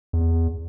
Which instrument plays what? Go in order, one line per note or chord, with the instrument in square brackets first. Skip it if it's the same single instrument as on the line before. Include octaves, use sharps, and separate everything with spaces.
[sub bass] E2